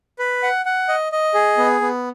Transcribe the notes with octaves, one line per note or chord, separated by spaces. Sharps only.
B4
F#5
F#5
D#5
D#5
G#4
B3
B3